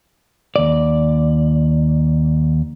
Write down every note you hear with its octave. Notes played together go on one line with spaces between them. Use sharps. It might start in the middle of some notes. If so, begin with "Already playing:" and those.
D#2 D5